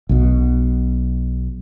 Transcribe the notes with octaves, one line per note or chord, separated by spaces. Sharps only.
B1 B2